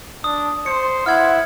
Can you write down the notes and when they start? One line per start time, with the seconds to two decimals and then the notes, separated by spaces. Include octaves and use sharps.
0.24 D4 D#6
0.66 C5 C#7
1.06 E4 F#5 F6 G#6